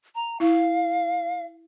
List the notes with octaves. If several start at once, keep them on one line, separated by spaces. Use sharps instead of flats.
A#5
E4 F5